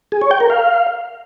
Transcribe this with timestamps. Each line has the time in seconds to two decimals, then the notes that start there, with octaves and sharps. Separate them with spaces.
0.12 G#4
0.21 C#5
0.31 G5
0.40 A#4
0.50 F5